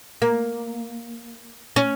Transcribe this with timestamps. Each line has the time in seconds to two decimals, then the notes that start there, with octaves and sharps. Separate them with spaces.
0.22 A#3
1.76 C#4